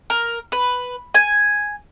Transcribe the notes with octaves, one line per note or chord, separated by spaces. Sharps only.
A#4
B4
G#5